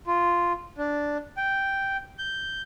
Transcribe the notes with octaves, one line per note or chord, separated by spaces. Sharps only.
F4
D4
G5
G6